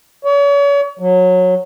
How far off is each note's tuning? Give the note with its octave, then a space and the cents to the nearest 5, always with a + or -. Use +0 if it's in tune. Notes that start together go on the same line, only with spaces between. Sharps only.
C#5 +40
F#3 -20